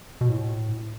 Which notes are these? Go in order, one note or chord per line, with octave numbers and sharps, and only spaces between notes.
B2
A2